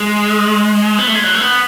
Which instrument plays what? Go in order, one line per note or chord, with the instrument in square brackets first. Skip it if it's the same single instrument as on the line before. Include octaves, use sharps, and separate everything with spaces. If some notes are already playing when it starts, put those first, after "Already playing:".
Already playing: [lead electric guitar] G#3
B3
A3
G#3
F#3
A3
B3